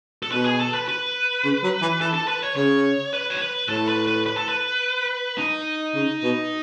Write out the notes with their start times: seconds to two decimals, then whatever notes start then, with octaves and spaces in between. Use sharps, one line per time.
0.23 A4
0.32 B2 B4
0.45 G#4
0.60 A4
0.74 B4
0.88 B4
1.44 C#3
1.63 F#3
1.82 E3
2.00 E3 A4
2.14 A4
2.28 B4
2.42 C#5
2.56 C#3 C#5
3.13 B4
3.30 C#5
3.41 B4
3.69 A2 A4
3.89 B4
4.07 B4
4.26 B4
4.37 A4
4.49 B4
5.38 D#4
5.95 C#3
6.23 B2